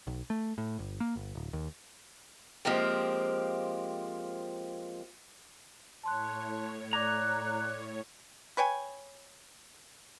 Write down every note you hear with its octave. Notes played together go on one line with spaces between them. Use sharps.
B1
A3
A2
G1
A#3
G1
D1
D#2
F3 G#3 A#3 C4 G4
A2 C#5 A5 C6 F#6
D5 A#5 D6 F#6 G#6
B4 C#5 G5 G#5